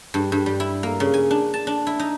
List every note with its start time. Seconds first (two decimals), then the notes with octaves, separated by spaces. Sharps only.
0.14 G2
0.32 G2
0.46 G3
0.60 E4
0.83 A#3
1.00 C#3
1.14 G#5
1.31 D4
1.54 A5
1.67 D4
1.87 E4
1.99 D#4